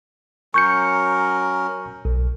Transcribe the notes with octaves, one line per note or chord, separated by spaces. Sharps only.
F#3 C#4 A#4 C#6 G6 C#7
B1